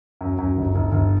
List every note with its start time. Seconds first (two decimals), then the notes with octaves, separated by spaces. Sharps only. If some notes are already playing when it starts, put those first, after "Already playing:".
0.21 F#2
0.38 F#2
0.57 G1
0.75 G1
0.92 G1